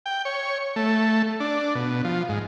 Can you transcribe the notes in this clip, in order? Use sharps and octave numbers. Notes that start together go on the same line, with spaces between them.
G5
C#5
A3
D4
B2
F3
G#2